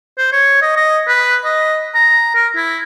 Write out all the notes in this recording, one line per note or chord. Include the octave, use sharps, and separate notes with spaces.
C5
C#5
D#5
D#5
B4
D#5
A#5
A#4
E4